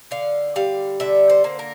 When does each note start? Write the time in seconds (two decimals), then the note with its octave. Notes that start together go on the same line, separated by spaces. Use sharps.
0.11 D3 F5
0.56 G3 F5
1.00 D3 E5
1.30 C5
1.44 A#3
1.59 A#4